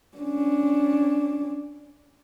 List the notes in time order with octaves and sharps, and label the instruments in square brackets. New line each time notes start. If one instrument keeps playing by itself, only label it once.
[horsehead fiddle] C#4 D4